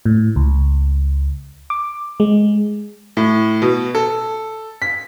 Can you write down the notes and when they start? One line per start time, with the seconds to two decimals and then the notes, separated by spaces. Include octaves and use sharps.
0.06 A2
0.36 C#2
1.70 D6
2.20 G#3
3.17 A2
3.62 B2
3.95 A4
4.82 B6